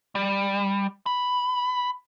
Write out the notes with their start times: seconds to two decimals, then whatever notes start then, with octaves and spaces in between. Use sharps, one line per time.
0.15 G3
1.06 B5